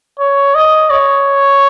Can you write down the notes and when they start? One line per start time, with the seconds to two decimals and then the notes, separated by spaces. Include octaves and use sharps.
0.19 C#5
0.55 D#5
0.90 C#5